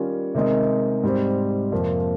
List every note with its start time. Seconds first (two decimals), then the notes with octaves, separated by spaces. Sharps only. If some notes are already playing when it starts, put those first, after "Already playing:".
Already playing: D#3 G3 C#4 F4
0.35 C3 D#3 G#3 D#4
1.03 G#2 G3 C4
1.72 F2 C3 F3 A#3